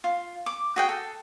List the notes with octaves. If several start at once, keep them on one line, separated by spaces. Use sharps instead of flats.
F4
D6
F#4 G#4 G5
A4